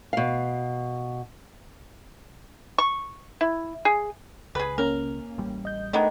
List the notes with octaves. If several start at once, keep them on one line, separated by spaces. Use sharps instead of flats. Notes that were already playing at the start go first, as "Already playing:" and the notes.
B2 F5
C#6
E4
G#4
C#2 G#4 B4
A#3 C#4 A#4
A1 G3
D#5 G6
D#3 G#3 A3 B3 D4 D#4